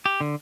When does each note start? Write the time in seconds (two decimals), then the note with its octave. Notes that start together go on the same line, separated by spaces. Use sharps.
0.06 G4
0.21 D3